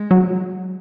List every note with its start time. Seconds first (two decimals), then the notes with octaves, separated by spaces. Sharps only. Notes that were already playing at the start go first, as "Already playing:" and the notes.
Already playing: G#3
0.11 F#3